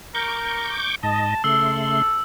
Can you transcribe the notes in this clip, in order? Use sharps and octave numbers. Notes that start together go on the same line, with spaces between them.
A#4 C#6 D6 G6
G#2 D#5 A5
C#3 A3 A4 C6 E6